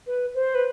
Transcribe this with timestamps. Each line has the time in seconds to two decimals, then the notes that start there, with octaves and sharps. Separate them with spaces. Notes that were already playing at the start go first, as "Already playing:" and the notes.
0.07 B4
0.35 C5
0.55 B4